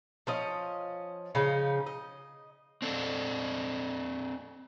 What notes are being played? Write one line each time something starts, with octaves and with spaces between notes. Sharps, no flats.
F3 C#4 D#5
C#3 F3 C#4 D#4
D#5
C4 D4 A4